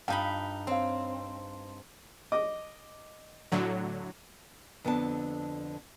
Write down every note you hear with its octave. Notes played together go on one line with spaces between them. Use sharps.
G2 D#4 F4 F5 G5 B5
C4 C#5 F5
D#5 D6
A2 D3 F#3
F2 D3 B3 D4 G5 A5